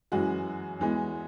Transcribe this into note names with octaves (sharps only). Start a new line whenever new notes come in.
F#2 E3 G#3 F#4
E2 E3 G#3